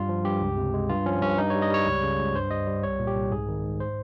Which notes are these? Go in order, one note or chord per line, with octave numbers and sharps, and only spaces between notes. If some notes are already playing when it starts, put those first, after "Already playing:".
Already playing: G2 G3 F4
F3
G2 G4
C#2
C3
G#3
G2 F4
F3 C#4
G2 C#4
G2 D#4
G3 C#5
D#5
G3 C#5
C#2
C#3
C#2
G2 C5
G3 D#5
G3
C2 C#5
A#2
G4
C2
G#2 G#4
D#3
G#2
C5